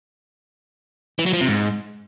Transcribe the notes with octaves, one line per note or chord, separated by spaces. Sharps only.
E3
F#3
F3
C3
G#2